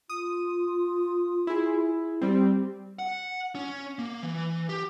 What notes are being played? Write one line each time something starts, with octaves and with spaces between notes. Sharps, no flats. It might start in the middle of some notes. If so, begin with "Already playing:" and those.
F4 D#6
E4 G#4
G3 C4 G4
F#5
C#4
A#3
E3
G4